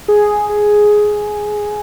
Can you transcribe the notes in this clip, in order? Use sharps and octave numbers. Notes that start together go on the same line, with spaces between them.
G#4
G#4